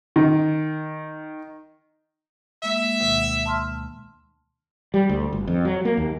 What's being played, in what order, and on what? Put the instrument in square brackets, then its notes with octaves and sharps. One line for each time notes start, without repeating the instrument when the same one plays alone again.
[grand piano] D#3
[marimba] G#3 A#3 [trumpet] E5
[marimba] D2 B2 D#3
A5 C6 F6
[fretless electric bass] G3
D2
G1
F2
F#3
A#3
D#2